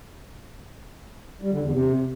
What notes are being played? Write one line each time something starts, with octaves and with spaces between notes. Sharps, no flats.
G3
D3
E2
C3